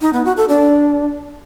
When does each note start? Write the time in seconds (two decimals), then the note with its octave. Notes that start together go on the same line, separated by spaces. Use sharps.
0.01 D#4
0.13 B3
0.25 F#4
0.37 A4
0.49 D4